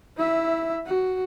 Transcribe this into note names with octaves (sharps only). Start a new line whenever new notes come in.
E4 E5
F#4